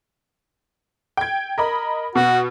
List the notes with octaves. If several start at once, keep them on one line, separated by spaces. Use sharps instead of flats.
G5 G#6
A#4 D#5 B5
B2 F#4